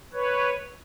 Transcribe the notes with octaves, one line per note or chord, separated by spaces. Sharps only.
B4 C#5